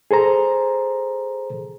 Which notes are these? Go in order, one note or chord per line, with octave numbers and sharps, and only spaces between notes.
G#4 A4 C5 A#5